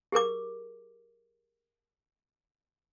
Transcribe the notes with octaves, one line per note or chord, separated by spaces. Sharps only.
G4 G#4 A#4 D6